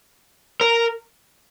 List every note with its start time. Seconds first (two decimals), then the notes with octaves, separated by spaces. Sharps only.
0.61 A#4